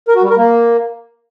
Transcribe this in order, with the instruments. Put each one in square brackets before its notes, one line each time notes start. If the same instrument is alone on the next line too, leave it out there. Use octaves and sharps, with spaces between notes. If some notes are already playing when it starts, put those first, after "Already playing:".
[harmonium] A#4
F#4
G3
A#4
A#3